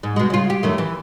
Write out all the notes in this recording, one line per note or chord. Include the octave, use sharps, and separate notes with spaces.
G#2
B2 G#3
C#3 F4
G4
F#2 D#3 A3
E3